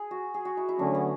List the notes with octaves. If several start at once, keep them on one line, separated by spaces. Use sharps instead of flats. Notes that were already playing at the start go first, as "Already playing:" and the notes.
Already playing: G#4
F#4
G#4
F#4
E4
E4
D3 F#3 A3 C#4 D4
B3